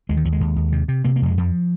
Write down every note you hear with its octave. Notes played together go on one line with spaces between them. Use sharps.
D#2 G#3
D#3
D#2 F3
G#3
D#2
D#2
C3
C3
C3 A#3
A#3
F2 G#3
F2 F3